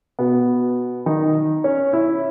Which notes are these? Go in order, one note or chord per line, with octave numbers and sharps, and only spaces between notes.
B2 B3
D#3 D#4
C#4 C#5
E4 E5